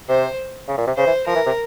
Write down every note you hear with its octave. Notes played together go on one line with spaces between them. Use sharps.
C3 C5
C#3
A#2
C3
C#3 C5
E3
F3 A#4
E3
C3